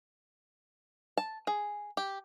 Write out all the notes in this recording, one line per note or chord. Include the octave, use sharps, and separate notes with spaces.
A5
G#4
G4